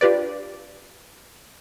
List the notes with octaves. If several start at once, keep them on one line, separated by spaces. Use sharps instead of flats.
D4 F4 G4 B4 D5